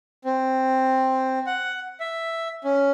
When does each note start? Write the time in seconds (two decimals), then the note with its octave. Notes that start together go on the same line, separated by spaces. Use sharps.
0.25 C4
1.47 F#5
2.00 E5
2.64 C#4